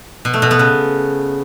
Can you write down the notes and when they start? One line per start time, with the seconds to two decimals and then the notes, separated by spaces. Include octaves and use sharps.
0.25 B2
0.34 A3
0.42 B2
0.51 B3
0.59 C#3